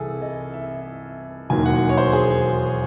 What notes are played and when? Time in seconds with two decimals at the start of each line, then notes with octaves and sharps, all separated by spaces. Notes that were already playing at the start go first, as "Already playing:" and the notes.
Already playing: C2 E3 G#4 A4
0.22 D#5
0.54 E5
1.50 E1 D#2 D#3 F#3 G#5
1.66 F#5
1.89 C#5
1.97 C5
2.13 G#4